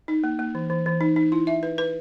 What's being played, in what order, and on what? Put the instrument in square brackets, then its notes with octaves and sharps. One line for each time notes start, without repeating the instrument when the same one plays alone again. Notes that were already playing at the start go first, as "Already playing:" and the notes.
[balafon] D#4
A#3
A#3
E3
E3
E3
D#4
D#4
E4
E5
B4
B4